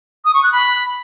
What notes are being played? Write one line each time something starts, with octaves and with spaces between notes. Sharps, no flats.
D#6
C#6
F#6
B5